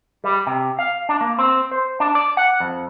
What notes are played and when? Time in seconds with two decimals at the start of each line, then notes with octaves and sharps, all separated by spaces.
0.24 G3
0.47 C3
0.79 F5
1.09 D4
1.21 A#3
1.39 C4
1.71 C5
2.00 D4
2.15 D5
2.37 F#5
2.60 F2